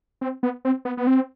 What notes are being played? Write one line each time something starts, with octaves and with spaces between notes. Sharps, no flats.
C4
B3
C4
B3
B3
C4